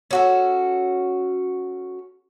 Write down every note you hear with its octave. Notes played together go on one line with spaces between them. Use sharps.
C#4 F#4 A4